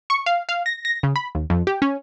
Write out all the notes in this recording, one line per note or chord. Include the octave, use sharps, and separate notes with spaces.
C#6
F5
F5
A#6
A#6
C#3
B5
D#2
F2
G4
C#4